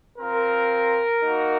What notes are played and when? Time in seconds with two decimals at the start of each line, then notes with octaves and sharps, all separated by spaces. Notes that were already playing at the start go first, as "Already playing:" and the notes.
0.19 C4 F4 A#4
1.21 A#3 D#4 F#4